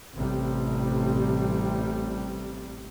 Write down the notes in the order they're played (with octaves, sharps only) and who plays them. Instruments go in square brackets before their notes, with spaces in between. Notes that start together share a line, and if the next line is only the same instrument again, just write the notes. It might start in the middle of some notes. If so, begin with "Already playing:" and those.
[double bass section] A1 C3 G3